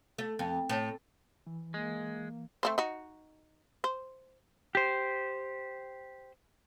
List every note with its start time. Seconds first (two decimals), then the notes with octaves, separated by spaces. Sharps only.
0.18 A3
0.39 F2
0.69 A2
1.47 E3
1.74 G#3 A#3
2.63 A3 C4 C5
2.78 D#4 F#4
3.84 C5
4.75 G4 C5